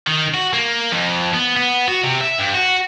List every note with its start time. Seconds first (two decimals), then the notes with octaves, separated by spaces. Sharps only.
0.07 D#3
0.34 F#4
0.53 A#3
0.92 F2
1.34 B3
1.57 B3
1.88 F#4
2.04 C3
2.21 E5
2.38 G2
2.55 F#4